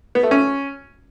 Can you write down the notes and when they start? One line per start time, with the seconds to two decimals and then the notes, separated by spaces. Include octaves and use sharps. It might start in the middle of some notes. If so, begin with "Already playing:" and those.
0.15 B3
0.23 A3
0.31 C#4